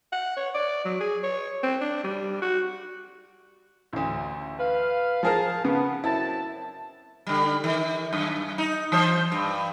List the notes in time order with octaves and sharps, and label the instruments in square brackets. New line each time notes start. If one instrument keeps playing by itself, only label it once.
[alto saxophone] F#5
C#5
D5
F#3
G#4
C#5
C4
D4
G3
F#4
[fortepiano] A1 D2
[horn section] B4 F5
[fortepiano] F3 G#4 A#4 [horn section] F5 A5
[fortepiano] C#3 [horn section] B3
[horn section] F#2 C4 A5 [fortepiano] E4
[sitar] D3 G3
D#3
F#2
D#4
E3 C5
G2